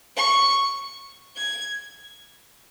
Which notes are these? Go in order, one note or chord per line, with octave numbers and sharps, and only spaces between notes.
C#6
G#6